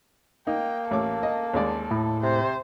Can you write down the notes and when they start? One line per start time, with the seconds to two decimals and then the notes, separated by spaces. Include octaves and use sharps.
0.47 A#3 D#4 G5
0.91 A1 A4 C#5 D6
1.23 D#5
1.54 D#2 G#3 D5
1.91 A2
2.23 C3 C5